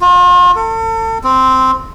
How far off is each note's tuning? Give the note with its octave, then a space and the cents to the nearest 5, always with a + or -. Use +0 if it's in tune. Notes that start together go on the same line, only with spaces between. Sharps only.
F4 +40
A4 +35
C4 -5